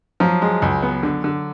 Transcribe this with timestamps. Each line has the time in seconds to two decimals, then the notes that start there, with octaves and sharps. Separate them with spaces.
0.20 F3 F#3
0.42 G#3
0.62 C#2
0.82 B3
1.03 D3
1.24 D3